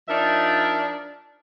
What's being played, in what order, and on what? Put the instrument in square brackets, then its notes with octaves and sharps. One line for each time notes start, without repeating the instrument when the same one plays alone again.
[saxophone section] F3 D4 D#4 A#4 D5 E5